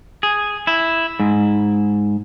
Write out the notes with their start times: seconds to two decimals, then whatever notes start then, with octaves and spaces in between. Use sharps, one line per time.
0.23 G#4
0.67 E4
1.20 G#2